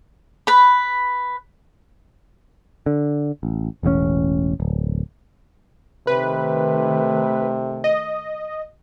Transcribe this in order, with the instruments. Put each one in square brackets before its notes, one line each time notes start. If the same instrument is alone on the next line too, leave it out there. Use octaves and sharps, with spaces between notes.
[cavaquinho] B4 B5
[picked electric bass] D3
A1
E1 A1 C#3 C#4
D1
[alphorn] C3 [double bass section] D#3 A3 [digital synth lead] B4
[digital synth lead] D#5